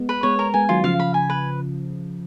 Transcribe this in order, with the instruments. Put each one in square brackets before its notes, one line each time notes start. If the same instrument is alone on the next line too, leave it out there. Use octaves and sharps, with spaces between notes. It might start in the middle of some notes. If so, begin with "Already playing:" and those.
Already playing: [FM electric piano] G#3 B3
[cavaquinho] B4
[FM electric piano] G#3 B3 [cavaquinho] C#5
[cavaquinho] A#4
[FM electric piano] G#3 B3 [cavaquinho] G#5
[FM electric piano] D#3 F#3 [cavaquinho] F4
[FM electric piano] C#3 F3 [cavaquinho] F5
[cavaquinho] B5
G#5
B4